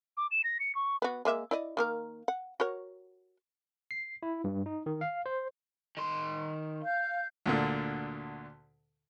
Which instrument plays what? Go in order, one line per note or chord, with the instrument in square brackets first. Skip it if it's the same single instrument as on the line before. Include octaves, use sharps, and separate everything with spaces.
[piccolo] D6
E7
A#6
C#7
C#6
[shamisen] B3 F#4
G#3 A#3 E5
E4 D5 D#5
D#3 A#3 A#4
F#5
F#4 A#4 C#5
[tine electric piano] C7
E4
G2
D#4
D#3
F5
C5
[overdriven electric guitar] D#3 C6
[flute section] F5 G6
[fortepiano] D2 A#2 D3